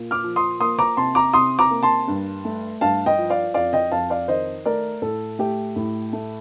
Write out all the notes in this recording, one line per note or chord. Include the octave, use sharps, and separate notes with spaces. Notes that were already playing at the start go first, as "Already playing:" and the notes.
Already playing: A#2
D6 F6
F3
C6 D#6
A#3 C6 D#6
A#5 D6
C3 A5 C6
A#5 D6
C3 C6 D#6
A#5 D6
A#3
A5 C6
G2
A3
G2 F5 A5
D#5 G5
F3
D5 F5
F2 D5 F5
D#5 G5
F2 F5 A5
D5 F5
D#3 C5 D#5
A3 A#4 D5
A2 A4
A3 G4
A2
A3